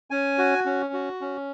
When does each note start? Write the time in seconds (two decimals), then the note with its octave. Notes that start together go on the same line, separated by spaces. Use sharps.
0.11 C#4 G#5
0.38 F#4
0.66 C#4
0.93 F#4
1.21 C#4